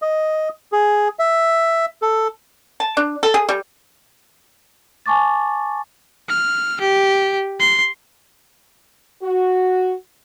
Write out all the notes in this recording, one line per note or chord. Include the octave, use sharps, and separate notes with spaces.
D#5
G#4
E5
A4
A5
D4
A4
G#4
G3
G#5 A5 C#6 D6 A6
F6
G4
C6
F#4